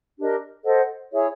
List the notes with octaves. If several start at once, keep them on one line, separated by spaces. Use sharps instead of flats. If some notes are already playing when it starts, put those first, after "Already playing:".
D4 G4 A#4 D#5
A4 C5 D#5 F#5
E4 G#4 C#5 E5